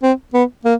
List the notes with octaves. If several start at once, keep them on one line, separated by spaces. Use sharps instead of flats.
C4
B3
A#3